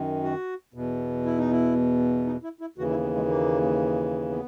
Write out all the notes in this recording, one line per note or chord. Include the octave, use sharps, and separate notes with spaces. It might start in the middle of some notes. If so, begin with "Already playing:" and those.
Already playing: F#2 D#3
F#4
E2 B2
E4
D#4
E4
D#4
E4
E4
D#2 C#3 E3 F#4
E4
B3
G#3
A#3
B3